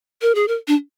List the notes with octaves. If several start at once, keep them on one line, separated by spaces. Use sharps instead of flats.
A#4
G#4
A#4
D4